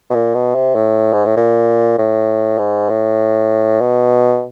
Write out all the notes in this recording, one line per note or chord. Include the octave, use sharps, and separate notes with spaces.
B2
A#2
B2
C3
A2
G#2
A2
A#2
A2
G#2
A2
B2